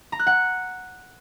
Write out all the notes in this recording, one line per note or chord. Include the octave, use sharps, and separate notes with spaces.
A#5
F#6
F#5